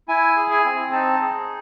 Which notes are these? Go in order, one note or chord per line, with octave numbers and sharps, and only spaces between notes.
E4 G#5
G#4
G#5
C4
D#4 A5
G#4